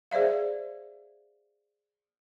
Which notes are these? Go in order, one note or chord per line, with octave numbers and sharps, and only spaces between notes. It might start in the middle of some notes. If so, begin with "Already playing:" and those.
G#4 C5 D5 E5 F5